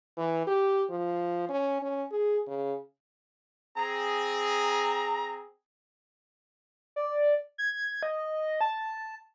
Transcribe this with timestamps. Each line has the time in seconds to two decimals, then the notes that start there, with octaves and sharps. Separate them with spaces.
0.17 E3
0.47 G4
0.90 F3
1.49 C#4
1.82 C#4
2.12 G#4
2.47 C#3
3.77 C4 G#4 A#5
6.96 D5
7.58 G#6
8.03 D#5
8.61 A5